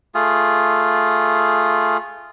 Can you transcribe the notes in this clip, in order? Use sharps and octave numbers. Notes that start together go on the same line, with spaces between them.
A3 F4 G#4